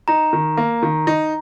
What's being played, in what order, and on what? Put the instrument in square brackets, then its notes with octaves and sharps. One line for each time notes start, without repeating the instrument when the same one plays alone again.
[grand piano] D#4 [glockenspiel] A#5
[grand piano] D#3
A#3
D#3
D#4